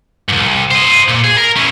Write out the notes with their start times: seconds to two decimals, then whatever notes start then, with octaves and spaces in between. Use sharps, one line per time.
0.29 C2 G#2
0.71 C5 D#5
1.08 A#2
1.24 G#4
1.38 A#4
1.56 C#4 E4